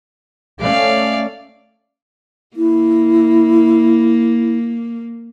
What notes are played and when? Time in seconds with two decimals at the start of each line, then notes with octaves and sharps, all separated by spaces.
0.60 A3 C#4 D5 F5
2.57 A#3 E4